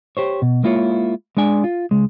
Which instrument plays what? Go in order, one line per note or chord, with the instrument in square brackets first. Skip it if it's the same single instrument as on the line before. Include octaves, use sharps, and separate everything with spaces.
[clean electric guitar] G4 C5 C#5
B2
G#3 A#3 E4 F4 C5 C#5
G#3 D4 D5 G#5
F4
C#2 G#3